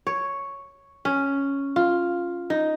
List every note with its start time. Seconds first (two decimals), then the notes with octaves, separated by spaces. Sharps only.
0.07 C#5
1.05 C#4
1.76 F4
2.50 D#4